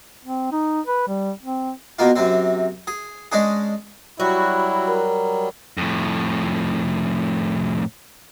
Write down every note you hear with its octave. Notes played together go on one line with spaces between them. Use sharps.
C4
D#4
B4
G3
C4
B2 A#3 F4
F#2 C3 C4
G#4
G#3 C#4 D4 G#4
F#3 G3 E4 F#4
A#4
F2 A2